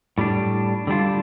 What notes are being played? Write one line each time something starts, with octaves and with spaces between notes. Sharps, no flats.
A2 G3 D4
D3 G3 D4 F4